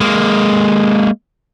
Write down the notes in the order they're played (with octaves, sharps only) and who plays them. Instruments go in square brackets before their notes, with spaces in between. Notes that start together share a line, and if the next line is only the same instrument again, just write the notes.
[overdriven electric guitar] G#3 A#3